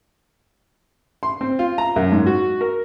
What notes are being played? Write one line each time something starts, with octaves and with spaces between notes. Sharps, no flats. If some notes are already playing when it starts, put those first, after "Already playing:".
C6
C4
F4
A#5
F#2
G#2
F#4
A#4